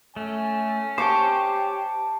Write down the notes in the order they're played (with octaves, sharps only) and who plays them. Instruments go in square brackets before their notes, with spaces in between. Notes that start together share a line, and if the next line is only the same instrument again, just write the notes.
[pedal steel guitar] A3 [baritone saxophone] C#4 [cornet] G#5
[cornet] G4 [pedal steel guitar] C5 C#5 G5 [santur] A5 C#6 D6